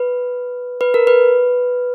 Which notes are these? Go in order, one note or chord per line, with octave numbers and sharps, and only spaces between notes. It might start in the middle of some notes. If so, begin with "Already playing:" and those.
Already playing: B4
B4
A#4
B4